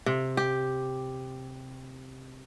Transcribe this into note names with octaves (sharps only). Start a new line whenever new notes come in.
C3
G4